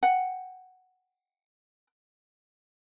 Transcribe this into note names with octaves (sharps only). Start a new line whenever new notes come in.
F#5 G5